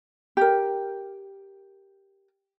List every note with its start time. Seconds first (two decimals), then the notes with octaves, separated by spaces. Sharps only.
0.37 G4 A#4